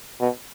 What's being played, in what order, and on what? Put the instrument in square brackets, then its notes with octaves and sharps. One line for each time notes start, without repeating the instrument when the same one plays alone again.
[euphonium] B2